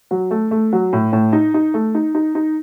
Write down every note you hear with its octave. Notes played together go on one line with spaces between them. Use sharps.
F#3
A3
A3
F#3
A2
A2
D#4
D#4
A3
D#4
D#4
D#4